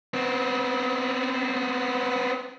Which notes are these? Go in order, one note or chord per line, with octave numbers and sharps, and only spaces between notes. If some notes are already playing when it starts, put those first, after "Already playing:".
B3 C4